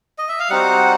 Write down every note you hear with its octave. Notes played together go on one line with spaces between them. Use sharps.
D#5
E5
F5
G3 C4 D#4 F#4 F#5